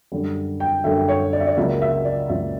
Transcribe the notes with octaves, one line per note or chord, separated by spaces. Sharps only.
F#2 D3 G3
G5
F#2 D3 G3 E5
C#5
D5
E5
D5
C#2 C#3 F#3 A#3 E5
E5
D5
C#2 C#3 F#3 A#3 E5